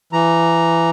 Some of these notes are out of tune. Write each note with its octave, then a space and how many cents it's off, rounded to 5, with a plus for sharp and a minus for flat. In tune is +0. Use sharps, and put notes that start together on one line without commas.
E3 +20 A#5 +0